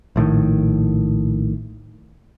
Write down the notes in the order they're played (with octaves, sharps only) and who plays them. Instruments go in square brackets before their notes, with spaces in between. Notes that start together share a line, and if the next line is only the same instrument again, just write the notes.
[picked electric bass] A#1 A2 D3 D#3